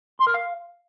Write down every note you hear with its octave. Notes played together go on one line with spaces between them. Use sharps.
C6
A#4
F5